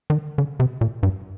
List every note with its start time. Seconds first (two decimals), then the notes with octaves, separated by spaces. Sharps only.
0.10 D#3
0.38 D3
0.60 C3
0.81 A#2
1.03 G2